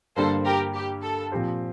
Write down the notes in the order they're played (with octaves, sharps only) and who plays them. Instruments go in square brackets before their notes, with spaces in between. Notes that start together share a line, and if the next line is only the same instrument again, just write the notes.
[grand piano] G2 D3 G3 A#3 [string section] A4 C5
[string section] G4 A#4
G4
A4
[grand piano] A#2 F3 C4 G4 C5